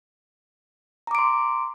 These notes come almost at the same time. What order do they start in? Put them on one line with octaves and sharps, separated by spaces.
A#5 D6 D7 C6